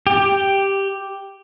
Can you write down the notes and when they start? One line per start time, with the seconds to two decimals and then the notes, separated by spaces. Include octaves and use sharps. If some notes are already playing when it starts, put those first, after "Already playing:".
0.07 G4